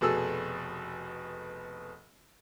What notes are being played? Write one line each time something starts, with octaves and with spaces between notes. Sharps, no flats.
F1 B2 G#4 A4 E6